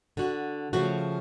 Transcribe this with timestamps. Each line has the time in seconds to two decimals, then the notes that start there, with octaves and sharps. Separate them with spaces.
0.17 D3 F#4
0.73 C#3 F3 A3 F#4